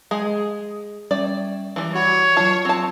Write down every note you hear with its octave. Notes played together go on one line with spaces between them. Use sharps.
G#3 G#4
G3 C#4 D5 E5
E3 G3 D5
F#4 C#5 F#5 B5
F#3 F4 A5
C4 A5